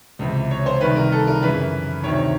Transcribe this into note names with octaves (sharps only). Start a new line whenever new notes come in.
C#2 C3 E3
C#5
C5
C2 C3 D#3 B4
A#4
A4
A#4
F#2 C#3 E3 B4
D2 C3 D#3 C#5